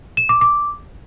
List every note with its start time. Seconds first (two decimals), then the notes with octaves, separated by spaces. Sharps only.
0.17 E7
0.29 D6
0.41 D6